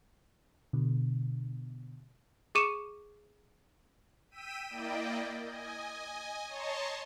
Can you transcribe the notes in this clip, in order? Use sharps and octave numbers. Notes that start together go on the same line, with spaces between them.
B2 D3
G#4 C#6 D6 C#7 D#7 E7
G5 E6 B6 D#7
A#3 E4 D5 D#5 G5
D#5 G#5
C#5 D#5 A5 A#5 C6 C#6